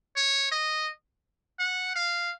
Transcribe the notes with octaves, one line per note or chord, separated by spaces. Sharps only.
C#5
D#5
F#5
F5